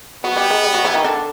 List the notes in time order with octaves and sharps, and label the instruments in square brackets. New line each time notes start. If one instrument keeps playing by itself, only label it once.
[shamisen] F#3 F#4 [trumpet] B3
[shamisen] G3 G4
G#3 G#4
G3 G4
F#3 F#4
E3 E4
D#3 D#4
D3 D4